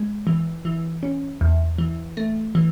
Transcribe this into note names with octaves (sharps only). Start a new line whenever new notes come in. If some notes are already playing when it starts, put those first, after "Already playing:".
Already playing: G#3
E3
E3
C#4
E2
E3
A3
E3